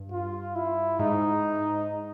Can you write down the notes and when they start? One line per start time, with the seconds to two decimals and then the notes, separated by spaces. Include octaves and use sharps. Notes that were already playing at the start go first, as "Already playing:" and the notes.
Already playing: G2
0.12 F4
0.55 E4
0.99 G#2 D#4